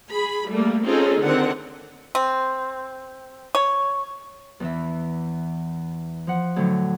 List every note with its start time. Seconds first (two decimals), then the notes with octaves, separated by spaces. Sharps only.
0.12 G#4 B5
0.49 G3 A3 A#3
0.85 C4 C#4 D#4 F4 G#4 A4
1.20 D3 D#3 C4 F#5
2.15 C4
3.55 C#5
4.60 E2 E3 E5
6.27 F3 F#5
6.56 A2 D3 F#3